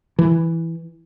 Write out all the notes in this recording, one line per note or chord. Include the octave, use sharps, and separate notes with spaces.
E3